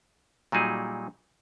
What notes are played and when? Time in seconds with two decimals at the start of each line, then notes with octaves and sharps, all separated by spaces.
0.52 A#2 F#3 G3 D#4 G#4